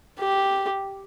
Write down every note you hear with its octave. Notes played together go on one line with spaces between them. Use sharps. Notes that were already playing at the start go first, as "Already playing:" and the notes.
G4